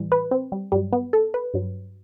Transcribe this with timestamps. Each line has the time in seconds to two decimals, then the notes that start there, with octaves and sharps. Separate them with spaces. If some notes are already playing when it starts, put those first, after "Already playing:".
Already playing: A2 E3 G3
0.12 B4
0.31 C4
0.52 G3
0.72 G2 F#3 G3
0.93 B3
1.13 A4
1.34 B4
1.54 G2 F#3